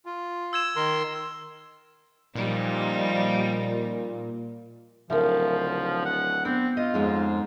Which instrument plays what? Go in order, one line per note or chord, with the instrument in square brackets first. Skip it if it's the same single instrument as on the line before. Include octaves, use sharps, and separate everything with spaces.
[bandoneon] F4
[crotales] E6 G#6 E7
[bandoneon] D#3 A#4 C6
[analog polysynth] A#2 [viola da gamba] F3 G3 D#4
[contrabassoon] D1 [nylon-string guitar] C#3 [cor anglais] F3 [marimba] A#4 E5
[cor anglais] F#5
[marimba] B3 [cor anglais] C4 [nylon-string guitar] D4
[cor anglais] F4 [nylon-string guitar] D#5
[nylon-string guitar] F2 G#3 C#4 [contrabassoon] G#2